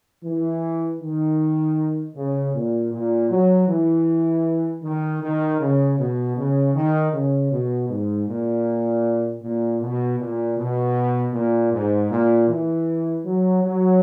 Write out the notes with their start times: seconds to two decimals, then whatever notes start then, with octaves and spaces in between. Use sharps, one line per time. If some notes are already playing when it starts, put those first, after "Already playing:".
0.24 E3
1.01 D#3
2.16 C#3
2.54 A#2
2.93 A#2
3.31 F#3
3.68 E3
4.83 D#3
5.23 D#3
5.61 C#3
5.99 B2
6.38 C#3
6.75 D#3
7.14 C#3
7.52 B2
7.90 G#2
8.28 A#2
9.43 A#2
9.81 B2
10.19 A#2
10.58 B2
11.34 A#2
11.73 G#2
12.11 A#2
12.49 E3
13.26 F#3
13.64 F#3